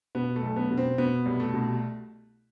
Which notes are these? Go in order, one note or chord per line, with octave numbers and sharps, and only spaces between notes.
B2 B3
A3
B1
B3
B2
C4
B2 B3
C2
A3
B2